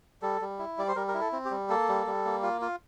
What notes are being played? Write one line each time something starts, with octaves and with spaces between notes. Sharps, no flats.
G3 A4
G3
E4
G3 D5
C5
G3 A#4
A#4
E4
A4
C4
G4
G3
A#3 A4
G3
G3
A#3
F4
F4